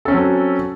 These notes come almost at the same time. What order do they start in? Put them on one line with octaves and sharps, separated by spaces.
A4 C#4 C4 F#3